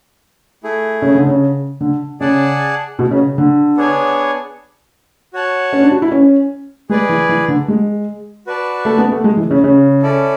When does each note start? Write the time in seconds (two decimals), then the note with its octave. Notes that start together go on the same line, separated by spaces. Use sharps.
0.63 A3 E4 G#4
1.02 C#3
1.15 D3
1.27 C#3
1.81 D3
2.20 C#3 G#4 D5 F#5 A5
2.99 B2
3.11 C#3
3.38 D3
3.77 B3 D4 G#4 C#5 G#5
5.33 F#4 C#5 F#5 A5
5.73 C#4
5.82 D4
5.92 F#4
6.02 E4
6.12 C#4
6.89 G#3 G#4 B4 D5
7.09 E3
7.29 E3
7.48 D3
7.68 G#3
8.47 F#4 B4 D5 A5
8.85 A3
8.98 B3
9.12 A3
9.24 G#3
9.37 E3
9.51 C#3
9.64 C#3
10.03 C#4 E4 A4 D5